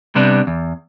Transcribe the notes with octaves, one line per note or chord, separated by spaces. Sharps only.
C3 G3 B3 D4
E2